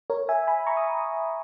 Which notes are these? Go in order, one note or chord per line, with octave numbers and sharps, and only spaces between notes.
A#4 C#5
E5 G#5
G#5 B5
A#5 C#6
D#6